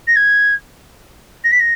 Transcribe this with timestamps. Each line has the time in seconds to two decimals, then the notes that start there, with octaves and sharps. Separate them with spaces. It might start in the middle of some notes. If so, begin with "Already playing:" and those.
0.07 A#6
0.15 G#6
1.44 A#6
1.51 B6
1.59 A#6